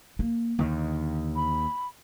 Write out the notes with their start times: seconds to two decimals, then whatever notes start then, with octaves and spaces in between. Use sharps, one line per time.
0.19 A#3
0.59 D#2 D3 D#3
1.36 B5